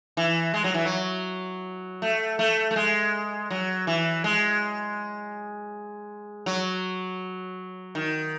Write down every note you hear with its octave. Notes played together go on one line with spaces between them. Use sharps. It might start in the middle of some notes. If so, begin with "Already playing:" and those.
E3
G#3
F#3
E3
F#3
A3
A3
A3
G#3
F#3
E3
G#3
F#3
D#3